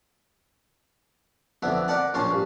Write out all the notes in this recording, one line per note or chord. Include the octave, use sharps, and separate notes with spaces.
F2 D3 B3 E5
A#4 D5 F#5 A5 B5
A#1 A#2 A#3 C#4 A5 C6
G2